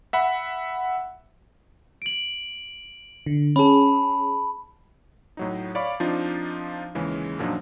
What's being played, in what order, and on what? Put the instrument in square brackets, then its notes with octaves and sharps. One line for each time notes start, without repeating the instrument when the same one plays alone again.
[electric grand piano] E5 F#5 B5
[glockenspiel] D7 F#7
[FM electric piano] D3
[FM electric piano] C#4 G#4 [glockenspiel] A5 B5
[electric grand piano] A2 F#3 D#4
C#5 D5 F5 B5 C#6 D6
F3 C4 D4 D#4 F4
D#2 C#3 E3 G#3
F#2 A#2 F3 F#3 D4 D#4